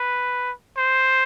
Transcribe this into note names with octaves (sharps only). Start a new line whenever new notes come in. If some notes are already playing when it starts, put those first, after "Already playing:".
Already playing: B4
C5